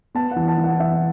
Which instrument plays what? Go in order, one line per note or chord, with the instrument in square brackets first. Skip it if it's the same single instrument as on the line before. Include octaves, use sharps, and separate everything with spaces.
[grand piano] B3 A5
F#5
E3
A5
E3
F#5
E3 E5